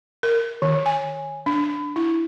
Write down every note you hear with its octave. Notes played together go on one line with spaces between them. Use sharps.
A#4
D#3
G#5
D4
E4